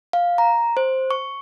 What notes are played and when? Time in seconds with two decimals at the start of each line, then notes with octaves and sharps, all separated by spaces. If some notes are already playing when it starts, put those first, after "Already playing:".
0.13 F5
0.38 A#5
0.77 C5
1.11 C#6